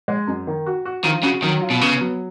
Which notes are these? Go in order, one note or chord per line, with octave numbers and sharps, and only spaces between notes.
G#3
F#2
D#3
F#4
F#4
D#3 F3
C#3 F#4
D#3 F#3
F4
B2
C#3 B3
F#3